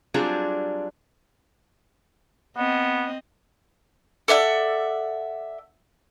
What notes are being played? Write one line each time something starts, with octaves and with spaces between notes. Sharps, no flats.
F#3 G3 C4 D4 F4 G#4
B3 C4 D#5
A4 D5 E5 F#5